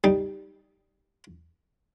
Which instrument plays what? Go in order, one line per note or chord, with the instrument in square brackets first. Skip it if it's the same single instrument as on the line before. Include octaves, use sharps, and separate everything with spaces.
[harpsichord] G3 D#4